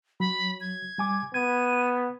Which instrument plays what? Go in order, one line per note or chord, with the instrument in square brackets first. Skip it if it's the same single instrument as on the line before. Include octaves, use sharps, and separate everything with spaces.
[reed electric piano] F#3 [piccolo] B5
[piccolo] G#6
[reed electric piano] G3 G#5 D6
[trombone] B3 [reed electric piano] G#6 [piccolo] D#7